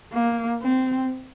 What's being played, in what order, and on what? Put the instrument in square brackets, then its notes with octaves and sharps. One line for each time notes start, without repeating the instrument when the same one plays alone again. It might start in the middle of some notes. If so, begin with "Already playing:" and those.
[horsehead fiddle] A#3
C4